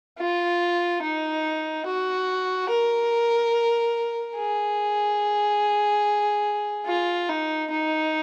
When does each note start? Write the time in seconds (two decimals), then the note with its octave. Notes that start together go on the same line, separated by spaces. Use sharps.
0.19 F4
1.02 D#4
1.86 F#4
2.70 A#4
4.37 G#4
6.86 F4
7.29 D#4
7.71 D#4